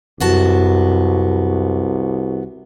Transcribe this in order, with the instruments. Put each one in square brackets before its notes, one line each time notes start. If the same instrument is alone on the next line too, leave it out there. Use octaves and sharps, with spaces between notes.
[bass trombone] C2 [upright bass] F#2 [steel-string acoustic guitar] B3 F#4 A5